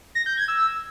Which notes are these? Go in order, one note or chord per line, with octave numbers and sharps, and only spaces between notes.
A#6
G6
G#6
E6